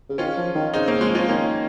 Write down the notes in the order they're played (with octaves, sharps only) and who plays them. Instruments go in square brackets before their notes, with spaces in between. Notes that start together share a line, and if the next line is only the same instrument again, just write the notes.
[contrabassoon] C#3
[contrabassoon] D#3 [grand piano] C#4 F4
[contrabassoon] F3
D#3
[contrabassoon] C#3 [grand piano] C4 D#4
[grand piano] A#3 C#4
F3 G#3
[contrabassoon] F3 [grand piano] C#4 F4
[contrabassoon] D#3 [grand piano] A#3 C#4